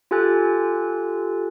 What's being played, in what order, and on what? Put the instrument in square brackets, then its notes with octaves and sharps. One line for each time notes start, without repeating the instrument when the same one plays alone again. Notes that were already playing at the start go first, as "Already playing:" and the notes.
[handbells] F4 G4 A4 G#5 F#6 A6